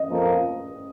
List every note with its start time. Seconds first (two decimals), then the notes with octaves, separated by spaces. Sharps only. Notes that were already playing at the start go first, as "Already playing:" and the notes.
Already playing: D#5
0.09 F2 F3 A#3